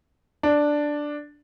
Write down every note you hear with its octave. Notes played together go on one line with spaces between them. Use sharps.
D4